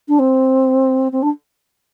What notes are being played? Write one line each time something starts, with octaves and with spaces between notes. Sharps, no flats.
D4
C4
C4
D4